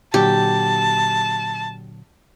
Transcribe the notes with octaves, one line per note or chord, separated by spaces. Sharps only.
A#2 D3 F#3 G4 A5